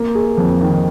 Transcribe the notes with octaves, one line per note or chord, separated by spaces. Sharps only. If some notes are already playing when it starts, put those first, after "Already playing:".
Already playing: A#3
G#4
F2
D#3